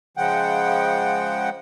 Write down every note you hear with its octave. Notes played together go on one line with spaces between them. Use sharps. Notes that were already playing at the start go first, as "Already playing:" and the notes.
C#3 F3 G#3 F#5 G5